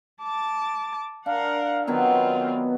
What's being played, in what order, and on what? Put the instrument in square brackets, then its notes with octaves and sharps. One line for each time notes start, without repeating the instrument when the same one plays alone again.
[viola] A5 D6
[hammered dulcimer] D4 [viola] A#4 F#5 [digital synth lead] F5
[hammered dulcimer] D#3 F#3 [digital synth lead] B3 [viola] C4 F4